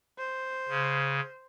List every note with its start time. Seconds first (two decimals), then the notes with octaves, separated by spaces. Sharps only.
0.18 C5
0.68 C#3